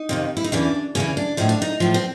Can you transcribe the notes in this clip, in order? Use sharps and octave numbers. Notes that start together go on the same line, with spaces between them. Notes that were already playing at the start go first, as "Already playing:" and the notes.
Already playing: D#4
F2 C3 D#3
E4
D#4
E2 C#3 E3 D4
E2 C#3 E3 C#4
D4
A2 F3 D#4
D4
D#4
A2 F3
C4